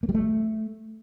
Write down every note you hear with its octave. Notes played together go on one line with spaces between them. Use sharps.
A#3
G3
A3